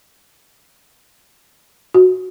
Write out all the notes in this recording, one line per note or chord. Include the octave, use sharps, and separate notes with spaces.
F#4